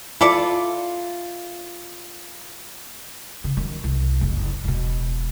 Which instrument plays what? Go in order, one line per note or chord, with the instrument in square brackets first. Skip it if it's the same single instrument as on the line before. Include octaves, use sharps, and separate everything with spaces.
[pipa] E4 A4 D5 [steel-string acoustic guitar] F4
[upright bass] C#3
F#2 D#3
C2
F#1 F2
E1 B2